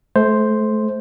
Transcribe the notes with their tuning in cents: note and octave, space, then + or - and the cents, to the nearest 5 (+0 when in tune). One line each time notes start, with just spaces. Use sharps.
A3 -30 C5 +0